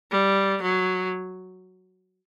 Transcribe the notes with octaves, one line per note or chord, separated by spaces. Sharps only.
G3
F#3